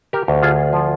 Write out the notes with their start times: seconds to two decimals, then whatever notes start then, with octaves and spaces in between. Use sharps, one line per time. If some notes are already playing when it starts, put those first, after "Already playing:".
0.13 G4 A#4
0.28 D2
0.43 F4 G#4
0.73 F3